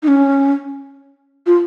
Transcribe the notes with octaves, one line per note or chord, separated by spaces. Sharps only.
D#4
C#4
F4